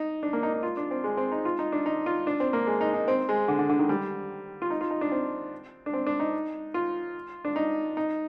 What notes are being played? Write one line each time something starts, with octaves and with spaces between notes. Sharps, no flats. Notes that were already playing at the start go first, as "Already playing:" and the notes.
Already playing: D#4
D4
A#3
D#4
D#4
F4
D4
C4
G#3
C4
D#4
F4
D#4
D4
D#4
F4
D4
C4
A#3
G#3
D#4
D#4
C4
G#3
D3
D3
D3
D#3
G3
F4
D#4
F4
D#4
D4
C4
D4
C4
D4
D#4
F4
D4
D#4
D#4